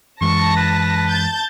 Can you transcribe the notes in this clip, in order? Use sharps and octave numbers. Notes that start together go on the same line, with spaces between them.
F#2 E3 G#3 A5 C#6 A#6
B4
A5 G6 A6